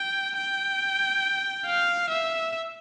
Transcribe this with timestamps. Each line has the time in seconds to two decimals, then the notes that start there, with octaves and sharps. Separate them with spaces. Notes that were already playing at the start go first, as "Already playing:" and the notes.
Already playing: G5
0.37 G5
1.66 F5
2.10 E5